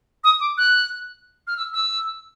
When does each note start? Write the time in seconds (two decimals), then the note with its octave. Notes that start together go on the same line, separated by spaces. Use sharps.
0.24 D#6
0.40 D6
0.58 F#6
1.47 F6
1.57 E6
1.74 E6